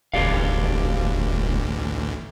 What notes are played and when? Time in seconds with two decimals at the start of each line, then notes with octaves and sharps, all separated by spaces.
0.13 E1 A1 D2 G4 D5 F5